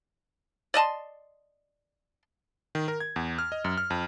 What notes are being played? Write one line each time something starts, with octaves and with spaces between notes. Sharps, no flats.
D5 D#5 A5 C6
D#3
A#4
G#6
E2
F6
D#5
F#2
F6
F2